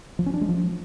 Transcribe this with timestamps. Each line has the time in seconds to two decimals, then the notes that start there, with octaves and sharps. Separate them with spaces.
0.19 F3
0.26 C#4
0.34 D4
0.41 G#3
0.49 F3